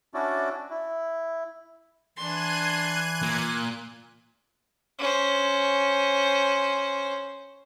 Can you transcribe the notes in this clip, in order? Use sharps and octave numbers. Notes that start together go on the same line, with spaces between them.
C#4 D4 E4 F#4 D5
E4
E3 D4 C6 F#6 G#6 D#7
A#2
C#4 C5